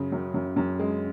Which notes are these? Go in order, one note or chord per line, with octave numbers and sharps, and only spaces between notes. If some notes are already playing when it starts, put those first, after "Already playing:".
Already playing: F#2 C#3
F#2
F#2
F#2
G#3